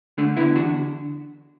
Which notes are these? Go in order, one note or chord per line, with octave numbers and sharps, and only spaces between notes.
D3 A3 D4
D3 B3 E4
E2 D4 F#4